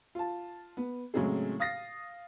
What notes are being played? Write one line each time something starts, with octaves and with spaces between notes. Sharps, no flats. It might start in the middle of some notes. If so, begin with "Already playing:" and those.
F4 A5
B3
A2 C#3 F#3 G#3 C4 G#4
F5 D#6 A6 A#6 C7